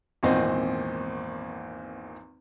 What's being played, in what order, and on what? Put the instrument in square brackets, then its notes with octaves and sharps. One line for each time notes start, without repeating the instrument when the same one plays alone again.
[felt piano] G#1 E2 A#2 C4 C5 D#5